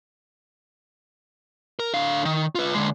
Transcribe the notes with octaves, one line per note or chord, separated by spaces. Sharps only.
A#4
D3 F5
D#3
F4 B4
D3 G#3